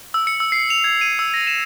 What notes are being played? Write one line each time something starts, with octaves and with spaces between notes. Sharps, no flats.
E6
C#7
E6
C7
F7
G#6
D#7
E6
A#6
E7